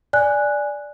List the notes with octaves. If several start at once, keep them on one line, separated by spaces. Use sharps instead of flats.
D5 G#5 F#6